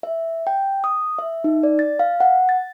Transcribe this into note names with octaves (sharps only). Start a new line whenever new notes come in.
E5
G5
D#6
E5
D#4
D5
A6
F5
F#5
A6